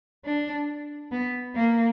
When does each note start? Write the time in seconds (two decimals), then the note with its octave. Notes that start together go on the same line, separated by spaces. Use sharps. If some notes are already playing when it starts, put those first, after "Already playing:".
0.25 D4
1.11 B3
1.56 A#3